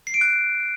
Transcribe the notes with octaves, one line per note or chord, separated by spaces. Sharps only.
C7
D7
F#6